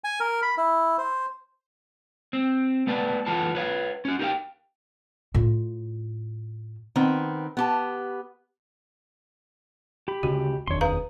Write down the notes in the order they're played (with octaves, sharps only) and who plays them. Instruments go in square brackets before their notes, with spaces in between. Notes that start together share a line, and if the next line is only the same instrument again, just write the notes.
[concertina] G#5
A#4
B5
E4
C5
[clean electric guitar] C4
A3 B3 B4 D5 A5
E3 F4 F#4 A4 B4 A5
B4 C#5 F5
C#4 F#4
D#4 G4 A#4 C5 F5 G5
[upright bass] A2 F4
[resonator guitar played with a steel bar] D#3 B3 C4
B3 G4 A5
[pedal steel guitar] G4 B5
[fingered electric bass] D2 C#3 [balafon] F#4
[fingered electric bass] F1 D#2 D4 [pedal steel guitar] C#5 C6
[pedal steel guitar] G#4 D#6 [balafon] B4 F5 A#5